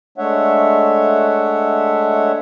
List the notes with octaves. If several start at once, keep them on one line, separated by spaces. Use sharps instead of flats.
G#3 A3 D4 C#5 E5 F#5